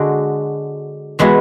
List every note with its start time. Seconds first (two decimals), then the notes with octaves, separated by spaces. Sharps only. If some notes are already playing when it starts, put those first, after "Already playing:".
Already playing: D3 G#3 D4 F#4
1.19 E3 G#3 B3 F#4